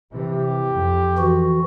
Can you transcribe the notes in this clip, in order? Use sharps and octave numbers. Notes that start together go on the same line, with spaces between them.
C3 E3 G4
F2
E3 F#4